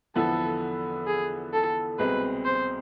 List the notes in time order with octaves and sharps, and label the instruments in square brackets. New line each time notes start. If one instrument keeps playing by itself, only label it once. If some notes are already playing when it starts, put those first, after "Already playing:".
[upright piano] E2 D3 F3 B3 E4 [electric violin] A4
[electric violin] G#4
A4
[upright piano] C2 B2 G#3 C4 G#4 [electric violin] B4
[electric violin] C5